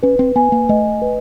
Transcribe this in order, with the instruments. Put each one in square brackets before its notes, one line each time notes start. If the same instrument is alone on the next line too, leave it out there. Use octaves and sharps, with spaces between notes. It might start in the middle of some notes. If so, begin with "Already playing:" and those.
[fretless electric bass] C#4 [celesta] B4
[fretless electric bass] C4
[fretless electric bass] B3 [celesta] G#5
[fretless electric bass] A#3
[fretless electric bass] A3 [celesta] D#5
[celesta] B4